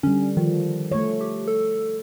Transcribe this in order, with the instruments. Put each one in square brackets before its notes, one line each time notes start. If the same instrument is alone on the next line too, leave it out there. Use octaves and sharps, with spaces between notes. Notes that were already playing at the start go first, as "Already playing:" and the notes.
[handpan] D3 G3 [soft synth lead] C#4
[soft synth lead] D#3 [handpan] F3
[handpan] A3 C#5
[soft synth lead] G4
A4